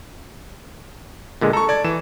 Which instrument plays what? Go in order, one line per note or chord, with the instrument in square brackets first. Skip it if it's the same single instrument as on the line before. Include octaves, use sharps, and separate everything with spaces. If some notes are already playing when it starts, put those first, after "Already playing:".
[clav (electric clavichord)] A#2 D3 G#3
[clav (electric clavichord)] A4 [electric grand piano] A#5 C#6
[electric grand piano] D5 G#6
E3 E7